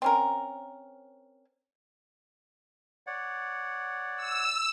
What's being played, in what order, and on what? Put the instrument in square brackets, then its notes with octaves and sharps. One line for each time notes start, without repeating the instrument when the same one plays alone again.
[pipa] C4 C#4 A#4
[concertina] C#5 D5 F#5
[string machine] E6